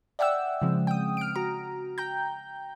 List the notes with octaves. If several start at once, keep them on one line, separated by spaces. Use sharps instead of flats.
D5 E5 F#5 G5 E6
C#3 F3 G#3 C4
G5 D#6
F6 D7
F#4 A#5
G5 A#5 G6